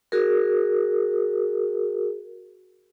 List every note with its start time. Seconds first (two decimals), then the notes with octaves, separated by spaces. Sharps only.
0.12 F#4 G#4 A#4